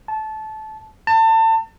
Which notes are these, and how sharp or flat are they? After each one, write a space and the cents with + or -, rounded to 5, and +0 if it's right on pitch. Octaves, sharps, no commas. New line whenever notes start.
A5 -20
A5 +30